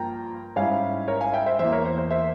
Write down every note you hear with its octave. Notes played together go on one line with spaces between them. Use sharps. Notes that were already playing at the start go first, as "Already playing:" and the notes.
Already playing: G2 F3 A#3 F4 G5 A#5
G#2 G3 C#4 E4 F5 G#5
A#4 C#5
F5 G#5
E5 G5
C5 E5
E2 E3 A#3 C5 E5
A#4 C#5
C5
C5
C5 E5